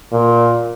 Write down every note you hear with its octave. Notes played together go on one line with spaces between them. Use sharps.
A#2